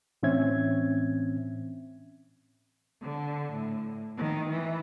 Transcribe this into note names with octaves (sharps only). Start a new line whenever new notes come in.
A2 E3 C4 C#4 E5 G#6
D3
A2
D#3
E3